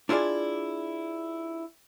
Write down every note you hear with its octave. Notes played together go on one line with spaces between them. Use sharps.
D4 E4 F4 G#4 D5